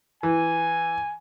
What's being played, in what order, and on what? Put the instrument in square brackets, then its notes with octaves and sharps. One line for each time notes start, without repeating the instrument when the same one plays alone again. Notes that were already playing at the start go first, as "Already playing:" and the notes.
[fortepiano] E3 [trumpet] G#5